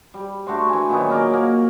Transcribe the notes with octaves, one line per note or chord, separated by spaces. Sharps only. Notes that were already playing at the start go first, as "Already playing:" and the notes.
G3
A3 D4 F#4 C6
E3 G#5
A#2 D#3 F#3 B3
C#4 A#4 D5 D#5
A#3